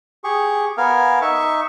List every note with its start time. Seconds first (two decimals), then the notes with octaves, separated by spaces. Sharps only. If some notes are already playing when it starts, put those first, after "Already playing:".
0.24 G4 G#4 C#6
0.78 B3 A#4 F5 G#5
1.22 D#4 E5 C#6